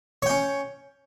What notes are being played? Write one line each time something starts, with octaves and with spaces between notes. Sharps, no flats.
C#4 C#5 G5